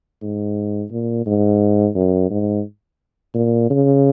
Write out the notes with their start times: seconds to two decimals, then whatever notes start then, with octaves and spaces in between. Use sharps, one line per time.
0.22 G#2
0.91 A#2
1.26 G#2
1.95 F#2
2.30 G#2
3.35 A#2
3.70 C#3